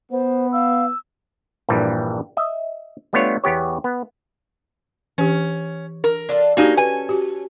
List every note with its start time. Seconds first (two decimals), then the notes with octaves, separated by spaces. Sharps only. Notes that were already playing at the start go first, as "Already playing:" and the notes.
0.12 B3 C5
0.53 F5 E6
1.69 A#1 G2 A#2 E3 G3
2.37 D#5 E5
3.13 G3 A3 B3 D4 F4 C#5
3.44 E2 B3 G4 C#5
3.84 B3
5.18 E3 C#4 G4
6.04 A#4
6.29 D4 F4 A4
6.57 A#3 C#4 D#4 F#4 G4 A4
6.77 B4 G#5
7.09 F#4 G4